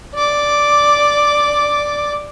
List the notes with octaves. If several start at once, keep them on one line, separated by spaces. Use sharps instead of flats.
D5 D6